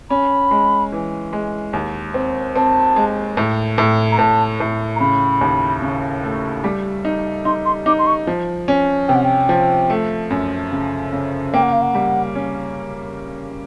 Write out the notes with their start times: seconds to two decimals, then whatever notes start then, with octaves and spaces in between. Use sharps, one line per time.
0.10 C#4 B5
0.51 G#3
0.92 E3
1.33 G#3
1.73 D#2
2.14 C4
2.55 C4 A5
2.96 G#3
3.37 A2
3.78 A2
4.11 A#5
4.18 A2 A5
4.60 A2
4.96 A#5
5.00 C#3 B5
5.41 D#2
5.82 C#3
6.23 A3
6.64 G3
7.05 D#4
7.45 D#4 C6
7.65 C6
7.86 D#4 D6
7.99 C6
8.06 C#6
8.27 F3
8.68 C#4
9.08 C3 G5
9.15 F#5
9.24 G5
9.49 F3
9.90 A3
10.30 F#2
10.72 C#3
11.12 C#3
11.54 A#3 G5
11.62 F#5
11.72 F5
11.82 F#5
11.95 G3
12.35 C#4